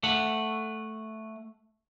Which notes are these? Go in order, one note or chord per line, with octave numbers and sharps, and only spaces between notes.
A3 F#5